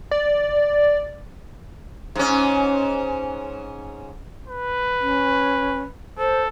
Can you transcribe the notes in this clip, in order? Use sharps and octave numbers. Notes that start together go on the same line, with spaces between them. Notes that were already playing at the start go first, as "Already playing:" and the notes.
D5
G#2 C#4
B4
C#4
A4 C5